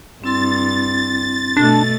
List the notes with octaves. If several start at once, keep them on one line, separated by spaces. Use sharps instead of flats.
G2 C4 E4 C6 A6
B2 A3 D4